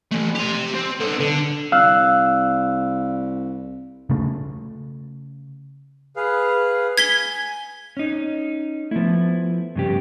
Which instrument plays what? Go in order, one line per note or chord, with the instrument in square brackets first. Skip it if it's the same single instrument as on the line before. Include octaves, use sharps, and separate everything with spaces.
[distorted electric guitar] E3 A3
G4 C6
C4
B3 A4
D3
[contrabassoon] C2 [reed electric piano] F5 E6 F#6
[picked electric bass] C#3 A3
[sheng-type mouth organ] G#4 B4 F5
[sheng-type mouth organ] G#5 [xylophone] G#6 B6 G7
[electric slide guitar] C#4 D#4
[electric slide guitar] F3 E4 [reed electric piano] A3 B3
[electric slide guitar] G2 C#3 G4